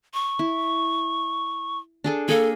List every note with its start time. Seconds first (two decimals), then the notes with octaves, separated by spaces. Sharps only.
0.14 C#6
0.39 E4
2.04 D4 G#4 A4
2.29 A#3 G#4 A4